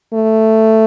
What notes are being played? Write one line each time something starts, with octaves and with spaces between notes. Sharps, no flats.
A3